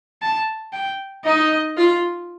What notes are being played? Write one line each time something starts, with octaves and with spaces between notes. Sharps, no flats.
A5
G5
D#4 D#5
F4